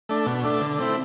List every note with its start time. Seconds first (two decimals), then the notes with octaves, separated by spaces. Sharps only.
0.09 A3 D4
0.26 B2
0.44 A3 D4
0.61 D3
0.78 A3 C4 E4